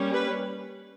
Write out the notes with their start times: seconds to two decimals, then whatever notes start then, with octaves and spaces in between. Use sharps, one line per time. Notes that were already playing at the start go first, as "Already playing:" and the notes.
Already playing: G3 A#3 C#4
0.14 B4